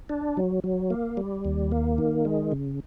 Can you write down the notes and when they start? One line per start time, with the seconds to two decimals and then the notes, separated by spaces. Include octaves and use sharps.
0.09 D4
0.37 F#3
0.64 F#3
0.90 A#3
1.17 G3
1.45 D#2
1.72 A#3
1.98 D#3
2.25 G#3
2.52 C#3